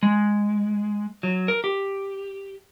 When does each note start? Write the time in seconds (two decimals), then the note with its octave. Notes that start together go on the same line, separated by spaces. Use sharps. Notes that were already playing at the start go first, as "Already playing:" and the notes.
0.03 G#3
1.23 F#3
1.48 A#4
1.64 G4